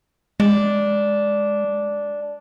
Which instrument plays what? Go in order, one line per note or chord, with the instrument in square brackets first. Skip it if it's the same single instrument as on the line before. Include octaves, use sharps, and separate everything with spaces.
[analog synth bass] G#3 [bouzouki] D4